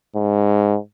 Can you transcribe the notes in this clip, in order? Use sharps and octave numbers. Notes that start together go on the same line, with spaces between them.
G#2